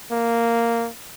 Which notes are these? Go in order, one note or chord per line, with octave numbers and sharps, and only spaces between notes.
A#3